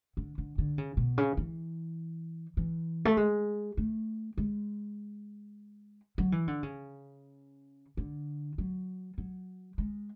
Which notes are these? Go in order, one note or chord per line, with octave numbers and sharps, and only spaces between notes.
D3
D3
D3
C#3
B2
C#3
E3
E3
A3
G#3
A3
G#3
F#3
E3
D3
C#3
D3
F#3
F#3
G#3